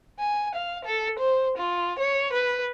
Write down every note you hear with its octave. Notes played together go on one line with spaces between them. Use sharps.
G#5
F5
A4
C5
F4
C#5
B4